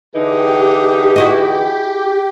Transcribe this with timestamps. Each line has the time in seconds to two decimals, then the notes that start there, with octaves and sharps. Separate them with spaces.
0.15 D3 E3 D#4 G4 G#4
1.16 E4 F#4 D#5